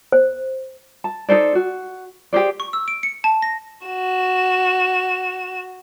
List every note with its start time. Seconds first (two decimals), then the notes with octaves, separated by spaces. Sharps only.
0.12 C5
1.04 A5
1.29 D#4 A4 C5 D5
1.55 F#4
2.33 G4 G#4 C5 D5
2.60 C#6
2.73 E6
2.88 D7
3.03 C#7
3.24 A5
3.42 A#6
3.87 F#4 E7